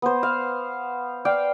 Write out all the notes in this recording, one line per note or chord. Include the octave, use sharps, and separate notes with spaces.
B3 C5
F5
D5 F5 G5